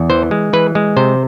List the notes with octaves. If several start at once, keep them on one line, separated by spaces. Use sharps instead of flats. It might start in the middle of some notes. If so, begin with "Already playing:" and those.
Already playing: E2
E3 C5
G#3
E3 B4
G#3
C3 C5